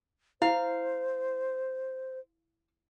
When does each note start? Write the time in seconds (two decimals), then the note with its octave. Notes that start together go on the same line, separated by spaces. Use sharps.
0.42 E4 C5 F5